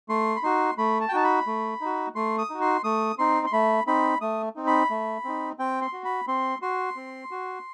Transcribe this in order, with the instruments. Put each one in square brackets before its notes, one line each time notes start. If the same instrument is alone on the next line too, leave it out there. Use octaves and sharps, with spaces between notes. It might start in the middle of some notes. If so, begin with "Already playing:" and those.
[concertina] A3 C6
B5
D#4 F#4 C6
A3 B5
A5
G5
D#4 F#4 A5
B5
A3
D#4 F#4
A3 C6
D#6
D#4 F#4
C6
A3 D#6
C4 D#4 C6
C6
A3 B5
C4 D#4 B5
A3 D#6
C4 D#4
B5
A3
C4 D#4
C4 G5
C6
F#4
B5
C4 C6
F#4 C6
C4
F#4